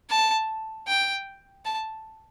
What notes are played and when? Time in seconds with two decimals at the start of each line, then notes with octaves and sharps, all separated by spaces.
0.10 A5
0.87 G5
1.65 A5